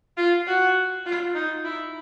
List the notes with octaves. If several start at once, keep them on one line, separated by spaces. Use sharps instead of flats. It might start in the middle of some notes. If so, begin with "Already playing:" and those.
F4
F#4
F4
D#4
E4